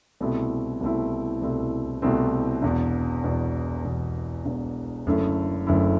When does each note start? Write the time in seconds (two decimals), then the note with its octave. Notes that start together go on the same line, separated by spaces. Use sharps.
0.21 C2 B2 A3 C4 E4
0.81 C2 B2 A3 C4 E4
1.42 C2 B2 A3 C4 E4
2.02 C2 B2 A3 C4 E4
2.62 E1 E2 B2
3.24 E1 E2 B2
3.84 E1 E2 B2
4.45 E1 E2 B2
5.06 F#1 F#2 D3 A3 E4
5.67 F#1 F#2 D3 A3 E4